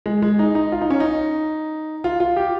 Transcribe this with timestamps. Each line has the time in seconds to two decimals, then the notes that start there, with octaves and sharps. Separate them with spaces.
0.06 G#3
0.22 G#3
0.39 D#4
0.55 D#4
0.72 F4
0.81 D#4
0.90 C#4
1.00 D#4
2.04 F4
2.20 F4
2.36 G4